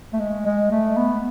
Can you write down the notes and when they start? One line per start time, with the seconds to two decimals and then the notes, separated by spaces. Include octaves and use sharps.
0.13 A3
0.20 G#3
0.45 G#3
0.72 A3
0.97 B3